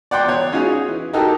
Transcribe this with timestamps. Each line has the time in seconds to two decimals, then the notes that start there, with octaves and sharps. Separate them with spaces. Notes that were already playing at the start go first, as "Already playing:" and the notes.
0.11 D5 F#5 G5 C6
0.24 E2 C#5
0.52 C#4 D#4 F4 F#4 G#4
0.88 E3
1.13 D#4 F#4 G4 A4 A#4